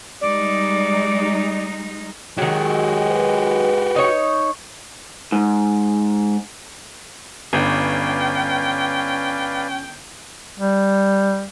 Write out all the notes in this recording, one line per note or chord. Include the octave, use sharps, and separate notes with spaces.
G3 G#3 D#4 D5
D#3 F#3 G#3 F#4 G4
B4
D#4 C#5
G#2
G1 C#4 B4 D5 F5 G5
G3